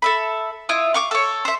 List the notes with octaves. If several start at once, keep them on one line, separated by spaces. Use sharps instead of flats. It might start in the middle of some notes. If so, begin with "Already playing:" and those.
A4 E5 B5
E4 F4 D#5
F5 C#6 D6
A4 C#5
C5 E5